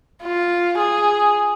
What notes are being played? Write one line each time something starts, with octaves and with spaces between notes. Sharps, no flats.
F4
G#4